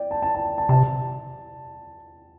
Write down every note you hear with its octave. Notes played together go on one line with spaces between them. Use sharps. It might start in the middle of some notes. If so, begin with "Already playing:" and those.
Already playing: D5 G5
A5
A5
A5
A5
C3 A5